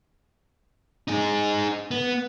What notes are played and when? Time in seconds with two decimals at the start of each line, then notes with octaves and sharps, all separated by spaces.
1.08 D#4 G#4
1.91 B3